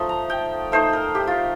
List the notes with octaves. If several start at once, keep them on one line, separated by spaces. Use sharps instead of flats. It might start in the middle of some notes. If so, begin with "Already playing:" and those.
Already playing: F3 A3 D#4 C6
A#5
G5
A3 D#4 C5
A#4
G4
F4